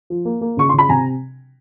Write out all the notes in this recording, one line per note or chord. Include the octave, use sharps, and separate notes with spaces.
F3
A#3
A#3
C#3 C#6
C#3 C6
B5
C3 G#5 A#5